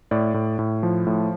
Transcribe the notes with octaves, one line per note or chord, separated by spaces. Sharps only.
A2 D5
A2
A2
F3
A2